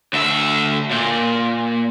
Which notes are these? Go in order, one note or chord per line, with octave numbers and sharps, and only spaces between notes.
D2 E5
A#2